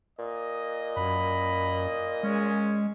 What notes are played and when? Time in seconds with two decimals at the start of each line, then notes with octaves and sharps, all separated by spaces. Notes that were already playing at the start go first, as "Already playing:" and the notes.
0.19 A#2 D#5
0.97 F#2 B5
2.23 G#3 C#4